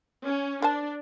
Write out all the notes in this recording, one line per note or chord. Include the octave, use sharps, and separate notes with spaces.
C#4
D4 A#4 C5 A5